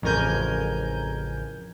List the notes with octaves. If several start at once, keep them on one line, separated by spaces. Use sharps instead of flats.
A1 F2 C#3 A#4 G#5 G6